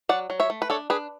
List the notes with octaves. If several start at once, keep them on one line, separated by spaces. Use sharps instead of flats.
F#3 D5 F#5
F#3
C#5 E5
A3
B4
D4 A4 C#5
D4 G#4 B4